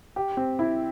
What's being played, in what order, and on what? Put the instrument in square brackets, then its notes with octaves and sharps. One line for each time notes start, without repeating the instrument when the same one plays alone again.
[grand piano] G4
C4
E4